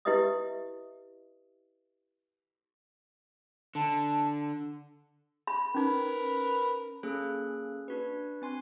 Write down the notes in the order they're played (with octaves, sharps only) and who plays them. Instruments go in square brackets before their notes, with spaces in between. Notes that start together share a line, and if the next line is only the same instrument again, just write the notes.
[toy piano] E4 G4 B4 D#5 E5 D#6
[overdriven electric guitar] D3 [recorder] A5
[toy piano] B5
[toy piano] C#4 D#4 [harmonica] A#4 B4
[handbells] A#3 C#4 G#4 A4 F#6
D4 F#4 B4
C4 G#5 C6